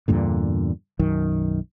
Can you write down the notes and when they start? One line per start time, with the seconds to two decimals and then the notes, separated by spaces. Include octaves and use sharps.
0.08 E2 G2 A#2 D3
0.99 B1 F#2 D#3